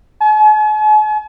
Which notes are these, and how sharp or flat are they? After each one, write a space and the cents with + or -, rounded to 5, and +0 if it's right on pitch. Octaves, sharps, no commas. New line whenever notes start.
G#5 +45